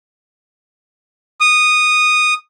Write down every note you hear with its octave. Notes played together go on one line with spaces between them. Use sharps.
D#6